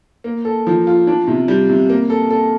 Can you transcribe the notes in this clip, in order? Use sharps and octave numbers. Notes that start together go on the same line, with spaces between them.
A#3
A4
F3
F4
D4
C3
G3
C3
A#3
A4
A4